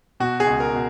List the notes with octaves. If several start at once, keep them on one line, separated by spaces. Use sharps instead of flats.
B2 F#4
G#4
C#2
A#4
B2